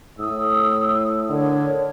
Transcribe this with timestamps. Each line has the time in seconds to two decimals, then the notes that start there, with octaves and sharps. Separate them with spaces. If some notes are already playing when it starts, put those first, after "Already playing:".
0.19 A2 D#6 E6
1.29 D3 A#4 C#5